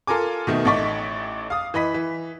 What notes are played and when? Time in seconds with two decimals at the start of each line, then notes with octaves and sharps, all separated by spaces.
0.07 F4 A4 A#4 G#5 D6
0.47 B2 D#3 A3
0.65 A1 A3 D#4 D5 C#6 B6
1.50 F5 D#6
1.74 E3 D#5 B5 B6
1.94 E3